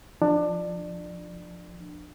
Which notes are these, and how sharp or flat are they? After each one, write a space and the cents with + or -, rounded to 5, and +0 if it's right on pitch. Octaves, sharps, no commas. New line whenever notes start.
F3 +0 D4 +20